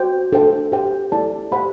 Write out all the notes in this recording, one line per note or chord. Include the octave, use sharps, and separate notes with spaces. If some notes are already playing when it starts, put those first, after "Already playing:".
Already playing: F#4 C5 G5
D4 A4 C5 G5
G4 C5 G5
E4 A4 D5 A5
G4 C5 F#5 B5